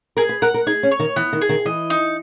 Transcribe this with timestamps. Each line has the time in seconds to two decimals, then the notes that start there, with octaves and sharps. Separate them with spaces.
0.17 G#4 A#4
0.29 B4
0.42 A#4 F#5
0.54 A#4
0.67 D#4 G#4
0.83 C#4
0.91 C#5
0.99 D#3
1.16 E3 B3
1.33 D#3
1.41 G#4
1.49 D#3
1.65 E3 D#5
1.90 D#4